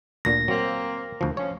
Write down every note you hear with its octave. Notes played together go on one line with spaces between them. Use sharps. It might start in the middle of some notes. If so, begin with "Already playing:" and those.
D2 A#2 D3 A#6
F#3 A#3 C4
D2 F3
F3 C#4 C#5